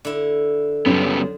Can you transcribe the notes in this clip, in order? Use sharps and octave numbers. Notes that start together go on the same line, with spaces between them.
D3 E4
F#2 C#3 G3 B3